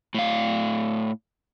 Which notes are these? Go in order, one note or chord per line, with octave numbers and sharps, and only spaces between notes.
A2 F5